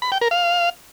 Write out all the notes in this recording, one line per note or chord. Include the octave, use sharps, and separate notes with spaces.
B5
G5
A#4
F5